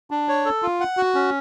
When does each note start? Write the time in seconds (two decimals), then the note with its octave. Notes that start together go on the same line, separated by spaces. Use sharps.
0.11 D4
0.28 C#5
0.46 A4
0.62 F4
0.80 F#5
0.97 F#4
1.15 C#4